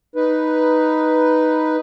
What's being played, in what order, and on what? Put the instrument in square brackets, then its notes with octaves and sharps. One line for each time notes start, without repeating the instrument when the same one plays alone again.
[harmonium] D#4 B4